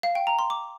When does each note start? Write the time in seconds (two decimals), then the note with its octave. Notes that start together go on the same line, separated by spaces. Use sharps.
0.03 F5
0.15 G5
0.27 A#5
0.39 C6
0.50 D6